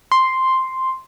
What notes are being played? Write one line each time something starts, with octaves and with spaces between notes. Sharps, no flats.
C6